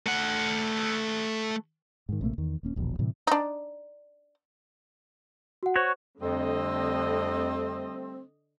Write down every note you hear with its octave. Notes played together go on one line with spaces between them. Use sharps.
A3 F#5
G#2 D#3
A#1 C3 A3 A#3
E2 D#3
D#1 A#3 C#4
E1 A#1 D#2 B2
A2 C3 E3 G3
D4 D#4
F#4 F#5
F#4 C5 C#5
F2 D3 G3 A3 C4 D#5